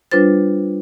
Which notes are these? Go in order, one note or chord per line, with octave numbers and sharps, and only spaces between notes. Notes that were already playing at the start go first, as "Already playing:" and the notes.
G3 D4 F4 B4 C5 A6